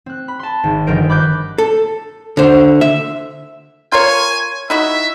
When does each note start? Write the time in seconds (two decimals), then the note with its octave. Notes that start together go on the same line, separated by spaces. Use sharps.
0.06 C4 F#6
0.28 B5
0.39 A5 C6
0.64 G#1
0.87 G1 D#3 F3 A#4 C5 D7
1.09 B5 D6 F#6 G6
1.58 A4
2.37 D3 C5
2.81 E5
3.92 F4 A#4 C#5 G#5
4.70 D#4 E4 F#4 E5